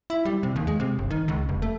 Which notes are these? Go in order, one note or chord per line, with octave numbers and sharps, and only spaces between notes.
E4
G3
C3
D#2
G#3
C3
G1
D#3
C#2
F1
A3